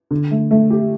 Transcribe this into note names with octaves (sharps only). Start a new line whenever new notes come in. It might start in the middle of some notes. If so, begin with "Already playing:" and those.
D3
A3
A3
G4